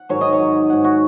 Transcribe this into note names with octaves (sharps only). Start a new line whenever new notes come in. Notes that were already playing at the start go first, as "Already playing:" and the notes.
Already playing: F#5
G#2 D#3 F#3 C#5
D#5
C#5
G#2 F#3
G#2 F#3 F#5
F#4